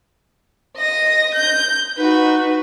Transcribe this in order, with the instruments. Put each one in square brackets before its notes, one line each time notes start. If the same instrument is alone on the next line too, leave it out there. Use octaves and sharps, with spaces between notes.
[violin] D#5 A#6
G6
[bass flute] D#4 [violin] F#4 B4